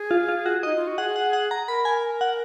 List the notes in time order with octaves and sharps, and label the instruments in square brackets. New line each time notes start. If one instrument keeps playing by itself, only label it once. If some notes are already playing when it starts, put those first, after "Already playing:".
Already playing: [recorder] G#4
[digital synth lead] F4
F4
F#4
[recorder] D#4 [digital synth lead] D#5
[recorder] F4
F#4
[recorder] G#4 [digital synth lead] F#5
[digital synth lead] F#5
F#5
A#5
[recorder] A#4 [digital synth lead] B5
[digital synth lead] G#5
F#5